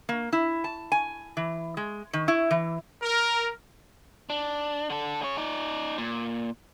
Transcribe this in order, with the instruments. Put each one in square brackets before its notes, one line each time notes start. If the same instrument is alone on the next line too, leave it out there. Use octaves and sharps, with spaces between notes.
[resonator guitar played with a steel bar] A#3
E4
A5
G#5
E3
G#3
D#3
E4
E3
[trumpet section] A#4
[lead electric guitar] D4
D3 A4
G#4 C#5
D#4 D5
A#2